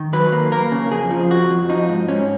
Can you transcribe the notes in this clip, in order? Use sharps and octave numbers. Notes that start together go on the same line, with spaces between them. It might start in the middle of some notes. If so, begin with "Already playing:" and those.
Already playing: D#3
F#3 B4
A#3
A#3 A#4
C#3
F2 G#4
F3
F2 F#4
F2
F3 D#4
G#2
G#2 C#4